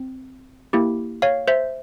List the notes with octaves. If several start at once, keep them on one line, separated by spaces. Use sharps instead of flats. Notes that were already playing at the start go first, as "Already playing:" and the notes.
Already playing: C4
A#3 E4 G4
C#5 F5
C5 E5